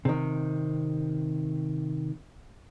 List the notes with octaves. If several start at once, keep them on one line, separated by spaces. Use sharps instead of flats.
C3 D#3